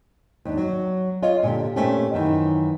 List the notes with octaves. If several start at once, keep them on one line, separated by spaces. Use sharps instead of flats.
D#2 D4
F#3
F4 C#5 D#5 F5
A#2 D3 G4
A#2 A3 C4 C#4 G4
F#2 D#3 E3